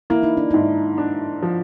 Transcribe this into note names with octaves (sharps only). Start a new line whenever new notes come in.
A#3 E4
D#4
D4
G#2 D#4
D4
F3